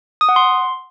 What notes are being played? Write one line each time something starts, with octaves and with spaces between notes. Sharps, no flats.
D#6
F#5
C6